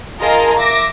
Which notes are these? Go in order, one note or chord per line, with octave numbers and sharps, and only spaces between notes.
F4 G#4 A#4 D#5 A5 A#5
E5 D6 A#6